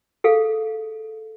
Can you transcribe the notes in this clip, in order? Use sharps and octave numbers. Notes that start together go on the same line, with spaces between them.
G#4 A4 F5